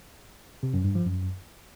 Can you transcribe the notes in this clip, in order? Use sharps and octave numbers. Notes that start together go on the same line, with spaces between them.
C3
F#2
G2
F3
F#2